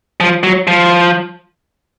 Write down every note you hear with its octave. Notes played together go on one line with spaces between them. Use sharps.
F3
F#3
F3